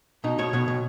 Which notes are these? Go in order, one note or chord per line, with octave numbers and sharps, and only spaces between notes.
B2 D#4
B2 C#5
B2 C#5
B2